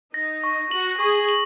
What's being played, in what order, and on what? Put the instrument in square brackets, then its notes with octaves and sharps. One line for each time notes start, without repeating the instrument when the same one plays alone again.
[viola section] D#4 [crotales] A#6
[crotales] C#6
[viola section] F#4 [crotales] F#7
[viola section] G#4 [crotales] C#6
[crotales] F#7